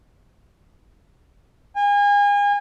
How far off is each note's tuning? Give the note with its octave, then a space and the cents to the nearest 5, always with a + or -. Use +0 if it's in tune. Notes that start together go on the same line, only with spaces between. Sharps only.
G#5 -35